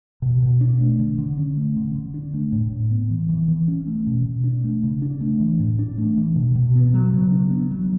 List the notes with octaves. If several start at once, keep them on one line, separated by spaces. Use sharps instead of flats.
B2
B2
D4
A3
D3
D3
C#4
A3
D3
D3
D4
A3
A2
A2
B3
E3
E3
E3
C#4
A3
B2
B2
D4
A3
C#3
D4
A3
E3
A2
D4
A3
E3
B2
B2
B3
F#3
C#3
D4
B3
F#3